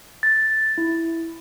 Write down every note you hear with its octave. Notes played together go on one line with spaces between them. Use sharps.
A6
E4